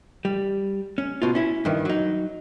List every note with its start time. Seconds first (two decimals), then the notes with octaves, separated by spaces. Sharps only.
0.25 G3
0.98 C#4
1.22 B2 F4
1.35 C#4 E4
1.65 G2 D#3 E3
1.85 F#3 D#4